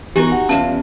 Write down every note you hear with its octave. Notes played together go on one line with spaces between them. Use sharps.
E3 B3 D#4 F#4 G4 A#4 G#5
F#5
E2 A2 C#4 F4 F5 A5